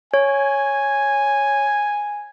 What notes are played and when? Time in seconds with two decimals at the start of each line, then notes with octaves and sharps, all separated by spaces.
0.14 C#5 G#5